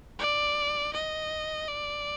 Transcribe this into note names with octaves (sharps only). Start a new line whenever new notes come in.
D5
D#5
D5